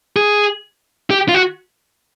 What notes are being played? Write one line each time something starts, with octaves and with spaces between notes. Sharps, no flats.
G#4
G4
F4
F#4